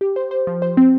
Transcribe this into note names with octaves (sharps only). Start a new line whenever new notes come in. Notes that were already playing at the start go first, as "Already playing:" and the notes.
G4
C5
C5
F3
C5
C4